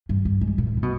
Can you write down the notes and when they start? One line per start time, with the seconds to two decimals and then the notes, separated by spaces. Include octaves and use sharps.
0.09 G2
0.25 G2
0.41 G#2
0.58 A#2
0.77 C#3
0.83 B2